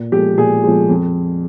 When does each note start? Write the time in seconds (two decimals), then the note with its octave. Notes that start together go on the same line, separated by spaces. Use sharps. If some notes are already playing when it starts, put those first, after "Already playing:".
Already playing: A#2
0.12 F3 G#3 G4
0.38 A#2 G#4
0.64 F3 G#3
0.89 F2